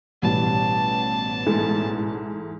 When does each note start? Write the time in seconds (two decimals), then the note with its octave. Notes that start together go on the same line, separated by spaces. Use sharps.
0.22 A1 B2 G3 A5
1.46 G#2 E3 A3